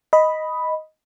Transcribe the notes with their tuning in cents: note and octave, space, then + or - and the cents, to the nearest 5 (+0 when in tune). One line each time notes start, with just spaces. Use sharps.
D#5 +5 B5 +0